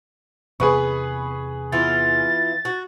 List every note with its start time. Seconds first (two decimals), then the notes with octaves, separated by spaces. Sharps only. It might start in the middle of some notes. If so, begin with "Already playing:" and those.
0.60 E2 C3 B3 G#4 B4 C#6
1.72 E3 B3 F4 A6
2.65 F#4